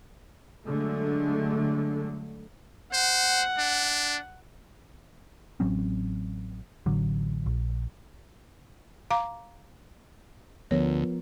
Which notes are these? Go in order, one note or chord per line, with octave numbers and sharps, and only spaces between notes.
D3 F#3 G#3 A3
C5 F#5
D4
A1 F#3 C4 C#4
A1 D3 F#3
A#1
F5 A#5 D6
D2 F3 B3 A#4 C#5